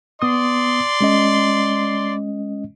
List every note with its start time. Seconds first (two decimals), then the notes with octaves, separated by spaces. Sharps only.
0.22 B3 D5 C6 D#6
1.01 G#3 C#4 D#5